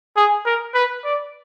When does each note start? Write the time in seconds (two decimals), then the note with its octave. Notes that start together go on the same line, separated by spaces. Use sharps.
0.17 G#4
0.46 A#4
0.74 B4
1.05 D5